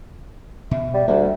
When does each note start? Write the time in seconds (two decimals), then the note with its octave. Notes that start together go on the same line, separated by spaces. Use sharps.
0.71 B2 E5
0.94 G3
1.08 D2 G3 A#3